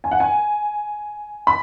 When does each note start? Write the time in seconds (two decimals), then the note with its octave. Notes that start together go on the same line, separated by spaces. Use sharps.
0.04 G#5
0.11 F#5
0.20 G#5
1.47 B5